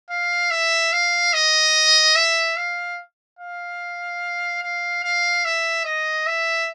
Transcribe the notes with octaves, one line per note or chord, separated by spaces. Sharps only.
F5
E5
F5
D#5
E5
F5
F5
F5
F5
E5
D#5
E5